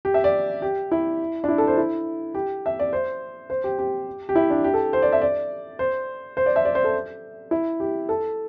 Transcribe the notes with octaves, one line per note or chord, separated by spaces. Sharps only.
G4
E5
D5
G4
E4
D4
E4
A4
C5
E4
G4
E5
D5
C5
C5
G4
G4
G4
E4
D4
G4
A4
C5
D5
E5
D5
C5
C5
D5
E5
D5
C5
A4
E4
G4
A4